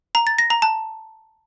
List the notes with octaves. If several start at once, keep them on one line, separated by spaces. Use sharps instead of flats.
A#5
A6
A#6
A#5
A5